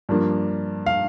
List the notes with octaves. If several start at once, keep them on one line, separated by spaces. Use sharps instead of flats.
G2 F3 A#3 D4
F5